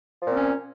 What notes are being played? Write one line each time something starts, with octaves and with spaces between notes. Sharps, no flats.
A#2 F3 C4 C#4